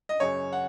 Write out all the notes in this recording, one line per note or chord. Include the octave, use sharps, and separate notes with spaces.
D#5
F#2 C#3 C#5
F#5